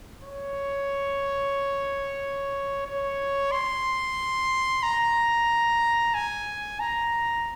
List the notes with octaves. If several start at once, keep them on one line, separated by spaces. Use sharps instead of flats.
C#5
C#5
C6
A#5
G#5
A#5